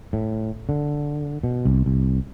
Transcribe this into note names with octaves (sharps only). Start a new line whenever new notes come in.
A2
D3
B2
C2
C2